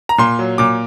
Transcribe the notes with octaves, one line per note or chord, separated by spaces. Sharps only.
A#5
A#2 C6
F#3
A#2 D6